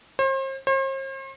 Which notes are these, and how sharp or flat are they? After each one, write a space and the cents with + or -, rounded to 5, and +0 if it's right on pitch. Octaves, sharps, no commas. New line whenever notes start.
C5 +40
C5 +45